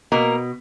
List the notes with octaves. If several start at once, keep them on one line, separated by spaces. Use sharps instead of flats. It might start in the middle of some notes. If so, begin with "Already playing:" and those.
B2 A#3 A#4